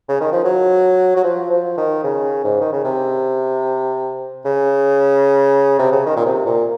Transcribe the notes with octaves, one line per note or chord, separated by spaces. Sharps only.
C#3
D#3
F3
F#3
F#3
F3
F3
D#3
C#3
G#2
D#3
C#3
C3
C#3
C3
C#3
D#3
A#2
C3
A#2